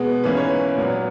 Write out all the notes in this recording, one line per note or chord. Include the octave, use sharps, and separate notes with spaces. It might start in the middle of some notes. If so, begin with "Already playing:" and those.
Already playing: B2 G#3 B3
G#2 E3 A#3 C#4 B4
C#5
B4
A#2 F#3 B3